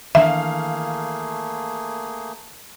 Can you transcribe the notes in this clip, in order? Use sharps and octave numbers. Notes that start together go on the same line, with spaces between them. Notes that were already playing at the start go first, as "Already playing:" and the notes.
D#3 E3 A3 A#3 D4 G#4 E5 F5